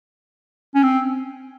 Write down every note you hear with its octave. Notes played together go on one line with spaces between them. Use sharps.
C#4
C4